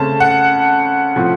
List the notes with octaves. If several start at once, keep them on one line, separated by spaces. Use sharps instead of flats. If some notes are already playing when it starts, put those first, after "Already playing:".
Already playing: C#3 A3 C4 A5
F#5
A2 F3 C4